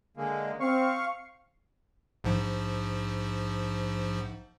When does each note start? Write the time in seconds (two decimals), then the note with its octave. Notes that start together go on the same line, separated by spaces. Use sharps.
0.17 D3 G#3 A#3
0.60 C4 F5 C#6
2.24 A#1 G#2 F3